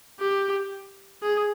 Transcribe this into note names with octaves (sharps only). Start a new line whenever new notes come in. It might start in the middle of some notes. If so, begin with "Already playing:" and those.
G4
G#4